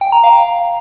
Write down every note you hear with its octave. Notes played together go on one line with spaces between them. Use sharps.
G5
A#5
F5